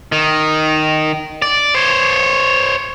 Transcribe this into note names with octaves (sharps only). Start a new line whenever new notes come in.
D#3
D5
C5 C#5